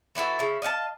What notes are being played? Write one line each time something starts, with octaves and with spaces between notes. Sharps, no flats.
E3 E4 F#4 A4
C#3 E4
D#5 F5 F#5 A5